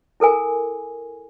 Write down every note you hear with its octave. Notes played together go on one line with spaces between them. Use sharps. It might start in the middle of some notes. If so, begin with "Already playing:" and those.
E4 A4 A#4 G#5